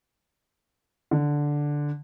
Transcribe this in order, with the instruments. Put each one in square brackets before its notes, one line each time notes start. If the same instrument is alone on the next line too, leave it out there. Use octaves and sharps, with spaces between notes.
[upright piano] D3